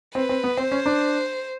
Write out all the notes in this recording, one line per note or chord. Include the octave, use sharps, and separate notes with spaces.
C4 B4
C4
B3
C4 C5
C#4
D4